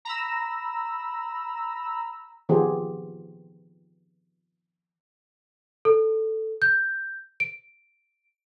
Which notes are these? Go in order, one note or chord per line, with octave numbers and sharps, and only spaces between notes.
A#5 B5 E6
D#3 F3 B3 G4 G#4 C5
A4
G6
D7